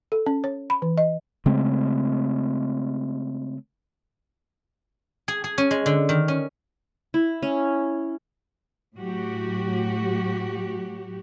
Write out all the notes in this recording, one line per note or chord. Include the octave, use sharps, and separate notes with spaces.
A4
C#4
C#5
B5
E3
D#5
C#3 G#3 A3 C4
G#4
G#4
C#4
G#3
D3
D#3
C#4
E4
C#4
A2 F#3 F#4 G4